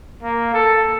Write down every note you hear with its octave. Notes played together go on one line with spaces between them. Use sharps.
A#3
A4